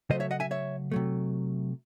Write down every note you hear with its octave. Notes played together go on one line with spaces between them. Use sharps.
C#3 F#3 A3 C5 D#5
C#5 E5
D#5 F#5
E5 G#5
C#5 E5
C3 F#3 A3